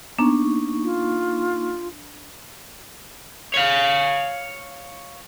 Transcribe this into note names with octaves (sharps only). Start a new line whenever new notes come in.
A#3 B3 D4 D#4 A#5 C#6
F4
C#5 F5